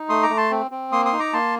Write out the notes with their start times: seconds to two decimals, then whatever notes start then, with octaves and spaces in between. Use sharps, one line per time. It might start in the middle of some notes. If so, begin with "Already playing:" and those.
Already playing: D#4
0.09 A3 C6 D#6
0.23 A#5 D6
0.29 A3
0.37 A5 C6
0.51 C4
0.71 C4
0.92 A#3 C6 D#6
1.05 C6 D#6
1.13 D#4
1.19 A#5 D6
1.33 A#3 A5 C6